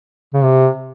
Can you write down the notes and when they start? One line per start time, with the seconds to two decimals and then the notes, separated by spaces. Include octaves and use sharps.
0.34 C#3
0.43 C3